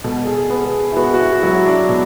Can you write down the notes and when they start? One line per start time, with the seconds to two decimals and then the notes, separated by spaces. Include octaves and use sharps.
0.04 B2 A4
0.25 G#4
0.35 A4
0.50 B3
0.66 G#4
0.92 E4
0.97 B3 F#4
1.14 F#4
1.20 E4
1.33 F#4
1.43 F#3 E4
1.66 D4
1.89 B2